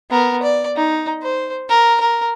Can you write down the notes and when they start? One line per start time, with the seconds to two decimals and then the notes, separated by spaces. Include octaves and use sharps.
0.11 B3 A#4
0.43 D5
0.76 D#4
1.22 C5
1.69 A#4
2.00 A#4